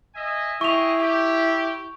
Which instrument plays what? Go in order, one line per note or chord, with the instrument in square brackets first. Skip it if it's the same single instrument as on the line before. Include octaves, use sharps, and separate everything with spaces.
[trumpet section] D#5 E5 G#5
[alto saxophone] E4 [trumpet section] G4 G#4 D#5 [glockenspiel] C#6 F7
[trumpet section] G4